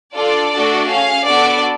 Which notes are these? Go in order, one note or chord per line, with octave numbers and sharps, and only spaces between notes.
D4 F4 A4 D5
A3 D4 F#4 A4
C#4 G#4 F5
B3 D4 F#4 A4 D5